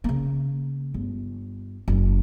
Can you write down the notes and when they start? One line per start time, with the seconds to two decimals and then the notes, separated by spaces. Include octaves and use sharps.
0.04 C#3 A#3
0.94 G1
1.88 F#1